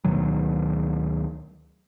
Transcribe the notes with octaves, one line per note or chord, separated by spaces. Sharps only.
D2 B2 D#3 F#3